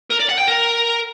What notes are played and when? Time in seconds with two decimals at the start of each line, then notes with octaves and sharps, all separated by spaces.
0.10 A#4
0.20 D5
0.29 F#5
0.38 G5
0.47 A#4